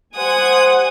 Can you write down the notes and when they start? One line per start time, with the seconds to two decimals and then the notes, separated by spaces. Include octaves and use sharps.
0.16 G3 C5 F#5 G#5 D#6